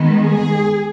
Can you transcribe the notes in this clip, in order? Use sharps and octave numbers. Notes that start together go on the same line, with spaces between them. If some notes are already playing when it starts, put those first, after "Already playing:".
Already playing: D#3 G#3 B3
G#4